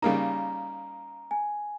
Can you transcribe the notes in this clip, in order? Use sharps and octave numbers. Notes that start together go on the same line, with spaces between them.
C#3 G3 A#3 D#4 A#5
G#5